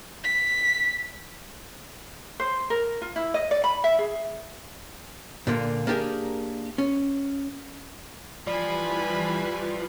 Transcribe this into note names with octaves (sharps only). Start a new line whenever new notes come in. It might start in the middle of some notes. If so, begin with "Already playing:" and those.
B6
C5
A#4
F4
E4
D#5
D5
B5
E5
G#4
A#2 D3 A#3
A#3 D4 G4 G#4 A#4
C#4
E3 F3 G3 B4 D5 G#5 B5